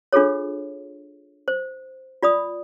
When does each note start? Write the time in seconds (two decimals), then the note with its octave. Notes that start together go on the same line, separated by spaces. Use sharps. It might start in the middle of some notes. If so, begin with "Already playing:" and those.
0.13 D4 F4 G#4 A4 C#5
1.48 C5
2.23 F4 D5 B5 D#6